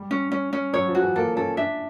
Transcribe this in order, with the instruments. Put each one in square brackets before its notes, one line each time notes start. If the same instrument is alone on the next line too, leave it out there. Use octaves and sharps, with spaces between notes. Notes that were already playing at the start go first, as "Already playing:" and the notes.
Already playing: [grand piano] G3
[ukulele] C#4
C#4
C#4
[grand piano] F#3 [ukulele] C#5
[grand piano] F3
[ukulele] F#4
[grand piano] E3
[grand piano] A#3 [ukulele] A4
[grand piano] C#4 [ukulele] A4
[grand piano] D4 [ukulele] E5